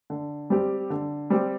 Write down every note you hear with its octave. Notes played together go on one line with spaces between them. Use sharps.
D3
G3 C4 G4
D3
G3 C4 G4